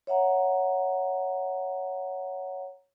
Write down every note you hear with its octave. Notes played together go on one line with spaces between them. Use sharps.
C#5 E5 F#5 A#5